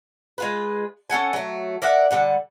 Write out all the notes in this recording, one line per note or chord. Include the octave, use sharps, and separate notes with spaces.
G#3 F4 B4
C#4 A4 F#5 G#5
F#3 A3
A#4 D5 E5 F#5
D3 G3 F#5